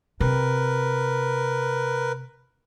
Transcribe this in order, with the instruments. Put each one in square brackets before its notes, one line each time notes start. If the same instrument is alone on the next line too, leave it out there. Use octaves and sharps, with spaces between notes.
[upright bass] C3 [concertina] A#4 B4